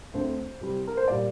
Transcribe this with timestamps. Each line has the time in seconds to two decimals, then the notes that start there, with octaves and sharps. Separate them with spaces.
0.14 D2 D3 A3 C4 C5
0.61 C2 C3 G3 C4
0.87 A#4
0.97 C5
1.08 A#2 G3 D5